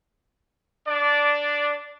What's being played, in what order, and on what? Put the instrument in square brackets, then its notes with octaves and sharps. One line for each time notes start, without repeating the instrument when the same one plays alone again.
[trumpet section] D4 D5